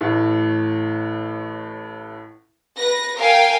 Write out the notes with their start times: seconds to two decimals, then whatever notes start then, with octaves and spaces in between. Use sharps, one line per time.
0.01 A1 A2
2.76 B4 A#6
3.16 A#4 F5 G5 G#5